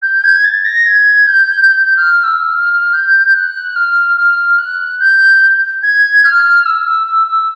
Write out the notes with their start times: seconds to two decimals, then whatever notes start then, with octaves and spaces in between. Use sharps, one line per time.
0.02 G6
0.14 G6
0.23 G#6
0.44 A6
0.65 A#6
0.85 G#6
1.27 G6
1.68 G6
1.96 F6
2.24 E6
2.51 F6
2.93 G6
3.34 F#6
3.75 F6
4.17 F6
4.58 F#6
4.99 G6
5.82 G#6
6.24 F6
6.65 E6
6.86 E6
7.06 E6
7.27 E6